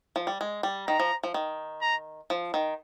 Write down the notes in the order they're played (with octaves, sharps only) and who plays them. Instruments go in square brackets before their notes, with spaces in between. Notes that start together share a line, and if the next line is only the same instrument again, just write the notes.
[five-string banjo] F3
G3
G#3
G3
[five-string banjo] D#3 [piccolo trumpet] A#5
[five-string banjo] F3
F3
D#3
[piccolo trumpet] A#5
[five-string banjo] F3
D#3